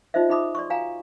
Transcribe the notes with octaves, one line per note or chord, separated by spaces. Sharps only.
D#4 F4 C5 D#5 E5
D#4 G#4 E5 B5 D6 D#6
D5 C6 C#6
F#4 F5 G#5 A#5